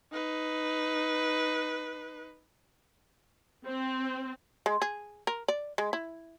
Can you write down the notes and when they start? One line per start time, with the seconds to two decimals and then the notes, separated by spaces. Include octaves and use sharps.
0.12 D#4 B4
3.65 C4
4.66 G#3
4.82 G#4
5.27 A#4
5.48 D5
5.78 G#3
5.93 E4